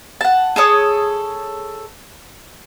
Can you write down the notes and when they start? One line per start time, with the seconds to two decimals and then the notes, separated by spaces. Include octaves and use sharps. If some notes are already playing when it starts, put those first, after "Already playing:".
0.21 F#5 A5
0.56 G#4 A4 C#5 D#6